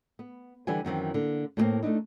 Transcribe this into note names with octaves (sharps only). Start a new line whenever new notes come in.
B3
D3 E3 G3 B4 F#5 G#5
F#2 D#3 E3 C4
D3 A#3
A2 G3 A#3 C4
A3 A#3 D4 D#4